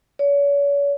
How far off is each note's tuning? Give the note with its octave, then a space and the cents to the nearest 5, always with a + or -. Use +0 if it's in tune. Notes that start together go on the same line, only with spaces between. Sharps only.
C#5 +40